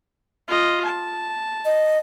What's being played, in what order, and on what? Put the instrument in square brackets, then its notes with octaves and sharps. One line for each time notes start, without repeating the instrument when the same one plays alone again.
[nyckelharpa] F4 D#5
A5
[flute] D#5